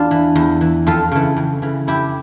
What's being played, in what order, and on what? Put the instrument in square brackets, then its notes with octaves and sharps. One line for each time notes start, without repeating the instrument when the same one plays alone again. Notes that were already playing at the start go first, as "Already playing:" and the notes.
Already playing: [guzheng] E2 A#3 D4 F4
E3
E2
E3
F2 F4 A4
C#3 E3
F2
C#3 E3
F2 E4 G4